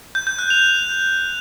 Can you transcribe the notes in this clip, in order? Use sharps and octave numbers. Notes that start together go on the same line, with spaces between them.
G6
G6
F#6
F7